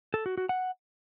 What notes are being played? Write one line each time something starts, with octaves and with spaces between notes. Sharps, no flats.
A4
F#4
F#4
F#5